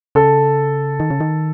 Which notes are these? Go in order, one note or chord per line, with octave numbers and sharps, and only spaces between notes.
C#3 A4
D#3
C#3
D#3